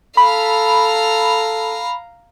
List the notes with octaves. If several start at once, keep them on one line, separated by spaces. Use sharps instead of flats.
A4 F5 A#5 B5